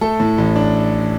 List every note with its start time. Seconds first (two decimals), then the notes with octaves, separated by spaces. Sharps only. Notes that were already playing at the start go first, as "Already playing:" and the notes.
0.01 A3 A4
0.20 A2
0.38 A1
0.56 D4